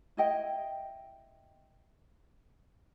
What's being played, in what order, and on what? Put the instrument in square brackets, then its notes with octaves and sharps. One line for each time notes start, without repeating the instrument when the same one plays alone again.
[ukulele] E4 D#5 G5